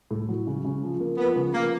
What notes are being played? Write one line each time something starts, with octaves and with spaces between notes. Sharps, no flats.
A2
F#3
C#3
C#3
F3
A#3
F3 B3
C#3
F3 A#3